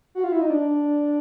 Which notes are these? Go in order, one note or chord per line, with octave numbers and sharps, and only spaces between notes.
F#4
F4
E4
D#4
D4